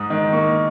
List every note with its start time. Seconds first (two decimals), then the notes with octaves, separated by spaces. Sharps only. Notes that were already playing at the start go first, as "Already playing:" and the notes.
Already playing: G#2 D#6
0.10 D#3
0.32 A#3 C#6